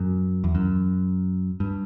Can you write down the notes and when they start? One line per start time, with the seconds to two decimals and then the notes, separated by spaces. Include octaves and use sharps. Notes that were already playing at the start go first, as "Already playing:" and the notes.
Already playing: F#2
0.44 E2
0.55 F#2
1.60 G2